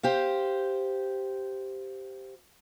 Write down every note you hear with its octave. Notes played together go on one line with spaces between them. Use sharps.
G4 C5 F5